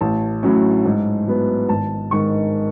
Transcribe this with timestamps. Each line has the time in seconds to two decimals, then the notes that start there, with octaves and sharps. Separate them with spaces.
0.01 A1 A5
0.43 A2 F#3 C#4
0.85 G#2
1.27 F#3 B3
1.69 G#1 A5
2.11 G#2 D#3 C#6